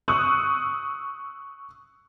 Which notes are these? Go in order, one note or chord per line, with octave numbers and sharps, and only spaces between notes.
C#6 D#6 E6 F#6